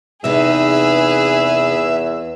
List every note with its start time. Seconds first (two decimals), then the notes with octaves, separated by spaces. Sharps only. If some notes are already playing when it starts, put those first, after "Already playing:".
0.24 E2 C3 D#4 G#4 B4 E5